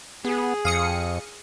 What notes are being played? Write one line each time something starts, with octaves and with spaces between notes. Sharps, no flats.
B3 G#4
F2 F5 D#6 C#7